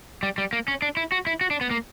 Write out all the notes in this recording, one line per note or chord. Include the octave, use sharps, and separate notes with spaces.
G3
G3
A#3
C#4
D4
E4
F#4
E4
F#4
D4
B3
A#3